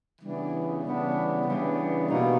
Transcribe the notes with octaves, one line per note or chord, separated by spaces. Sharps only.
C#3 E3 G3 B3 D4
C#3 E3 G3 B3 D4
C#3 E3 G3 B3 D4
B2 G3 A#3 D#4 F#4